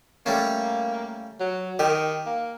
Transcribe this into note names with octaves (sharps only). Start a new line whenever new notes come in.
G3 A3 A#3 C#4
F#3
D#3 G4
A#3